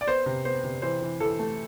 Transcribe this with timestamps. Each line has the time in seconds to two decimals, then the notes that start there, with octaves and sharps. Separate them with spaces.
0.01 D5
0.07 B3 C5
0.26 C3
0.45 B3 C5
0.64 C3
0.82 E3 C5
1.02 E3
1.20 E3 A4
1.39 A3